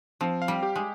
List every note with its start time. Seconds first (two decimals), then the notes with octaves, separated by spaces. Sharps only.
0.21 F3 C4
0.42 F5
0.48 G3
0.63 G4
0.76 G#3